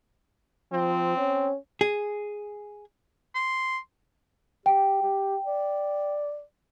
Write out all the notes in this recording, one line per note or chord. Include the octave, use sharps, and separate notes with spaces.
F3 C4
C#4
G#4
C6
G4 G5
G4
D5